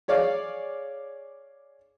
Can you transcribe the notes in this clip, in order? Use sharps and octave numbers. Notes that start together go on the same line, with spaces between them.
G#4 C#5 D5 F5